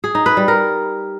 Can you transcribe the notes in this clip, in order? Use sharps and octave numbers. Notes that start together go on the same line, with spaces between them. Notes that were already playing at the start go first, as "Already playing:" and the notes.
G#4
D#4
B4
G3
A#4